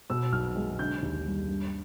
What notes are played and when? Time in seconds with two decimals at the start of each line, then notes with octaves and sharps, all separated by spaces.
0.10 B2 E6
0.33 B1 F6
0.56 G#3
0.79 D3 G6
1.02 D#2
1.25 G3
1.48 G2